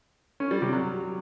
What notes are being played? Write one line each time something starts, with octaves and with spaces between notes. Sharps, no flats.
C#4
G3
C3
F#3